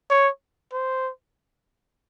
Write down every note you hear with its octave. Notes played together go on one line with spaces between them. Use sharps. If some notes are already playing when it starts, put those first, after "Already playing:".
C#5
C5